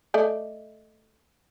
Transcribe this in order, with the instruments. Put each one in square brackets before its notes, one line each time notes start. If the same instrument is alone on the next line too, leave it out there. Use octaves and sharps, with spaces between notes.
[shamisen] A3 D5 D#5